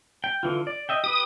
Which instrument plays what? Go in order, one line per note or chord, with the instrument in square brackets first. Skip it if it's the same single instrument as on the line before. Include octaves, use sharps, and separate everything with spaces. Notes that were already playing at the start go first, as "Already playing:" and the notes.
[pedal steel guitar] G5
D3 E3 F4
D5
D#5 E5 G5
[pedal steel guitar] G4 B4 [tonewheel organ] D#6